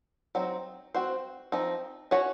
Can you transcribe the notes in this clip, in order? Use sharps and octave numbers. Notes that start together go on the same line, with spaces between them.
F#3 C4 D#4
C4 F#4 C5
F3 C4 D#4
C#4 F#4 C#5